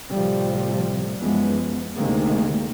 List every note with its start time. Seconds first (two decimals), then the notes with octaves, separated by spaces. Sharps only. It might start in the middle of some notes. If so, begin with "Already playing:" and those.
0.13 A2 C3 F3 G3
1.18 F#2 E3 F3 G#3 B3
1.97 D2 C3 D#3 G#3 A#3